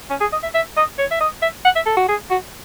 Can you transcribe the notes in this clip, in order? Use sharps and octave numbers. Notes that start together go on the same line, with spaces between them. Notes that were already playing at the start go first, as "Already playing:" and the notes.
C#4
G#4
D#5
E5
E5
D#5
C#5
E5
D#5
E5
F#5
E5
A4
F#4
G#4
F#4